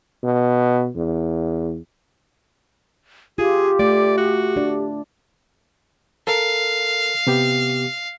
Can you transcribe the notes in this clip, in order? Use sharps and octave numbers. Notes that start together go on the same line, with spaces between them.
B2
E2
F4 G4 G#4
A3 D5
F#4
D4 D5
A4 A#4 F5
C3 B3 G4